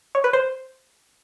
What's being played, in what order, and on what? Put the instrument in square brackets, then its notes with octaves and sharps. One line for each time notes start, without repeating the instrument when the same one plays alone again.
[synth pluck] C#5
B4
C5